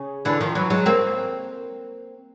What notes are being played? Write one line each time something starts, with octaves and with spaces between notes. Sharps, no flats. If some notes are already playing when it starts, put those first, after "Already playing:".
Already playing: C#3
D3 E3
D#3 F3
E3 F#3
F#3 G#3
A#3 C4